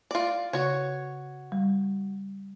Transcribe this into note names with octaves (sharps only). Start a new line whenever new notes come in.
F4 D5
C#3 F#4 C#5
G3